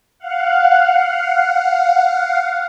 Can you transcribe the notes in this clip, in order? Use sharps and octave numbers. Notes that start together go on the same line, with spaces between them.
F5 F#5